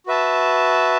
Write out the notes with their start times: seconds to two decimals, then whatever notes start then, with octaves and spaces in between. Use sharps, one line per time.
0.06 F#4 B4 E5 A5